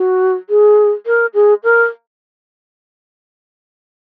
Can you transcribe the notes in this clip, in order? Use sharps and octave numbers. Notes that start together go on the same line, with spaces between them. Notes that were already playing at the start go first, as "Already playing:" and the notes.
Already playing: F#4
G#4
A#4
G#4
A#4